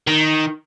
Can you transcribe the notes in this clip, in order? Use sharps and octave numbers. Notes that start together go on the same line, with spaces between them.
D#3